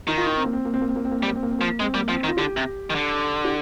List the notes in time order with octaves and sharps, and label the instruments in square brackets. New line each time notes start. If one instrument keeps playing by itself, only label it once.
[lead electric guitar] D#3 [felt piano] D#4
[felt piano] F4
D#4
C4
A#3
C4
A#3
C4
A#3
C4
A#3
C4
A#3
[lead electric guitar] G3 [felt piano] C4
[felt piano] A#3
C4
A#3
C4
[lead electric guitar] F3 [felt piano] A#3
[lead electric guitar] G#3 [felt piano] C4
[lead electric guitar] G3 [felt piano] A#3
[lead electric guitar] F3 [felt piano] C4
[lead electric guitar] D#3
[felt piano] F4
[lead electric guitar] D3 [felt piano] G4
[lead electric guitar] C3
D#3
D3
[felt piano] G4